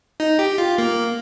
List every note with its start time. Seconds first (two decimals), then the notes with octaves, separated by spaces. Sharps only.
0.20 D#4
0.39 G4
0.58 F4
0.78 A#3